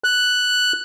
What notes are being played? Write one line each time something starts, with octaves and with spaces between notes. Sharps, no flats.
F#6